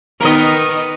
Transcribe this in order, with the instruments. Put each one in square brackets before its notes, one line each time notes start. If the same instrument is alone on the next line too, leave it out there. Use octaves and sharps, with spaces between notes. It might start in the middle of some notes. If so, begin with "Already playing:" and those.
[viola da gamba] D#3 B3 D#4 [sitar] A#4 D#5